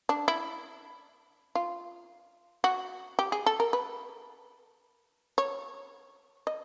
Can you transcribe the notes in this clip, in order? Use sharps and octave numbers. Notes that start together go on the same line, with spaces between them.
D4
E4
F4
F#4
G4
G#4
A4
A#4
B4
C#5
D#5